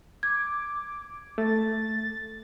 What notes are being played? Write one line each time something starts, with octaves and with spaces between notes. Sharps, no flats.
D6 G#6
A3 A6